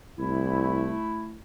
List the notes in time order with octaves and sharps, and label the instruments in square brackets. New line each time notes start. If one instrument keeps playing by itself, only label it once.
[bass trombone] C2 [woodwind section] A3 E4